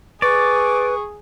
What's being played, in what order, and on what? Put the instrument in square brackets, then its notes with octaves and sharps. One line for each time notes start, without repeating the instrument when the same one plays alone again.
[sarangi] G#4 [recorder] B4 [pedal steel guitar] D5 [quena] C#6